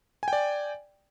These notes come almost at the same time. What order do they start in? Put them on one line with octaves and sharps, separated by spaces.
G#5 G5 D5